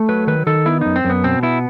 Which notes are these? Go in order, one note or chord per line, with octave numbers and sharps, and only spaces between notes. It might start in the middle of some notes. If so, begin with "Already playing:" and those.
Already playing: A3
F#3 B4
D#3 B4
D#3 A4
B3 E4
F#2 D#4
C4
F#2
B3
B2 C4
B3 E4